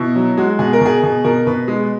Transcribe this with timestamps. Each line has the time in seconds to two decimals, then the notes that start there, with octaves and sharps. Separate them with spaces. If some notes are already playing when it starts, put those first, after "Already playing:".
Already playing: B2 E4
0.16 F#3
0.37 G#3 F#4
0.59 B2 G#4
0.73 A#4
0.81 B2 G#4
1.03 B2
1.24 B2 A#4
1.47 B2 B4
1.68 G#3